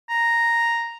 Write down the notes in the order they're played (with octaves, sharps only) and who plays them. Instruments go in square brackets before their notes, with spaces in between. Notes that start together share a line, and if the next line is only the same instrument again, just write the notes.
[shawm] A#5